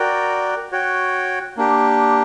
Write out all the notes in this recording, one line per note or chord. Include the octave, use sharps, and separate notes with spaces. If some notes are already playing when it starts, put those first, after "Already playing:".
Already playing: F#4 A#4 D5 G5
F#4 C#5 G5
A#3 D4 G4